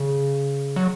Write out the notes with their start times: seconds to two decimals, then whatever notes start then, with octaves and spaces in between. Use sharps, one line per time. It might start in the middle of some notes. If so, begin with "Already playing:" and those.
Already playing: C#3
0.76 F#3